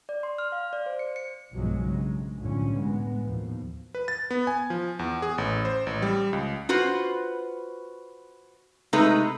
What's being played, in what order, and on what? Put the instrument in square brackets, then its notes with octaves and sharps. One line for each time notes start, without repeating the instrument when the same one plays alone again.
[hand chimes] D5
C6
F6
F5
D5
C5
C#7
C#7
[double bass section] B1 G2 B2 F3 F#3 G#3
G2 C#3 G#3
C2 F#2 A2 D3 F3 C#4
A2 G#3 B3
D#2 B2 F3
[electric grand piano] B4
A6
B3
G#5
F3
E2
G#4
A1
C5
A1
G3
C#2
[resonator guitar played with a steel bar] F4 F#4 B4 C5
C3 G#3 A3 D#4 B4